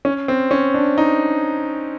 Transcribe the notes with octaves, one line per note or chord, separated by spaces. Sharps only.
C#4
C4
C#4
D4
D#4